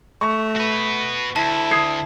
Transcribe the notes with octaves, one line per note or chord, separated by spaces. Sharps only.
A3 C#6
F#4 B4
D2 E4 A5
D#6 G#6 C7